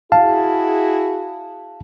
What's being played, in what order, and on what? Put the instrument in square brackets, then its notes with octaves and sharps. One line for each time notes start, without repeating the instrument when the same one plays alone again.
[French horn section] E4 F#4 G#4 [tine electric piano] F5 A5